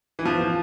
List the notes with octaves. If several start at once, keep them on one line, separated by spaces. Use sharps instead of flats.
E3
F3
F3